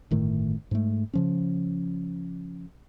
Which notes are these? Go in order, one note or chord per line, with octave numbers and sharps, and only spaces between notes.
G1 A2 D#3 A3
G#2 G#3 A3
C#3 F3 C#4